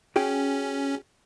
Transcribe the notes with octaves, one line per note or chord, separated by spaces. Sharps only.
C#4 F#4 G#4 G5